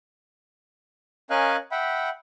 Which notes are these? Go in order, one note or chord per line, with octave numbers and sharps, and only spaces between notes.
C#4 A#4 D#5 F5 G#5 F#6
E5 F#5 G5 B5